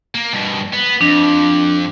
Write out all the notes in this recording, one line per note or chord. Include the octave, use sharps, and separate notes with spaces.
A#3
G2 B2
B3
F2 D4